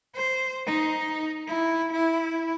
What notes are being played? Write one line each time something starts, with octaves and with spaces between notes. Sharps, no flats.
C5
D#4
E4
E4